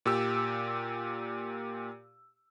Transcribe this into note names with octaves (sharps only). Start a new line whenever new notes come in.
A#2 G4 E6